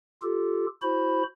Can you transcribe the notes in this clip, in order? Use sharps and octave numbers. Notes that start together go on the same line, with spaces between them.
F4 G4 A4
E4 F#4 C5 B5